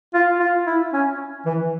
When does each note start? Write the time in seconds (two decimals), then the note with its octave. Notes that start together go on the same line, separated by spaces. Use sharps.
0.14 F4
0.40 F4
0.66 E4
0.93 C#4
1.46 E3